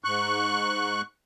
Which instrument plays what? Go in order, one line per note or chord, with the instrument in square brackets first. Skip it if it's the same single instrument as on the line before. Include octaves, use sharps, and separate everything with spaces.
[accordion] G#2 C#6 F#6